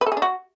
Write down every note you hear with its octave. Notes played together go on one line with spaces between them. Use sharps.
B4
A4
G#4
D4
F#4